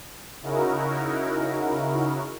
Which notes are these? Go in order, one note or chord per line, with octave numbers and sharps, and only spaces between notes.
C#3 D#4 E4 F#4 A#4